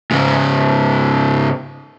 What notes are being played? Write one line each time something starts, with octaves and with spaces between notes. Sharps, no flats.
G#2 C#3